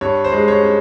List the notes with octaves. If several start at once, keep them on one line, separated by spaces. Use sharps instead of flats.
G2 C#5
C5
G#3
C#5
C#4